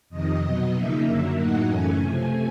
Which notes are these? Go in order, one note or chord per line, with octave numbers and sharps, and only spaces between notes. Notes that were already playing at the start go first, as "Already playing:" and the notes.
F2 C3 D#3 D#5
B2 F#3 B3
C#3 F3 A#3 D#4 E5
F#2 D3 F#3 A#3
A2 F#3 A#3 D#4 F#5
F#2 C#3 E3 A3 C#4 G#5
C3 F3 A3